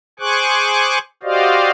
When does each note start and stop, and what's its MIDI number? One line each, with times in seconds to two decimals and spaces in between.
0.20 0.98 68
0.20 0.98 72
0.20 0.98 80
0.20 0.98 85
0.20 0.98 86
0.20 0.98 90
1.23 1.71 66
1.23 1.71 67
1.23 1.71 72
1.23 1.71 74
1.23 1.71 75
1.23 1.71 77